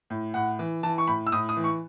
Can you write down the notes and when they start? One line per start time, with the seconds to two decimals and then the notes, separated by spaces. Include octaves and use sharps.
0.10 A2
0.34 A2 F#5
0.59 E3
0.83 E3 A5
0.98 C#6
1.08 A2 B5
1.27 E6
1.32 A2 D#6
1.49 D#6
1.57 E3
1.64 C#6